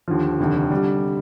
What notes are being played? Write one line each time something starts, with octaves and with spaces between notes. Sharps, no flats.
D#2 D3 F3
F1 D#2 D3
D3 G3